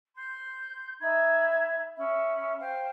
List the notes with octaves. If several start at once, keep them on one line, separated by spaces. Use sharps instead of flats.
C6 G6
D#4 E5 B5 G#6
C#4 E5 B5
C5 F5 G5